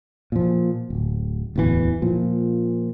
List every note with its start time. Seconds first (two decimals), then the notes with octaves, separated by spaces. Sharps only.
0.32 A#2 F3
0.90 D1
1.56 D1 E2 D#3 E3
2.02 A#2 F3